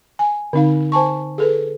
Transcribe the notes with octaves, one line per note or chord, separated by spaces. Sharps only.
G#5
D3 C4 D#4 F5
C5 G#5 A5 C#6
G#4 A4 B4